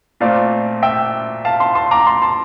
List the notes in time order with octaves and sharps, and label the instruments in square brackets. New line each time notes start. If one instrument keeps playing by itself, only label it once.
[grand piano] A#2 A3 C4 F4 D5 F5
E5 G5
F5 A5
A5 C6
A5 C6
A#5 D6
A5 C6
A5 C6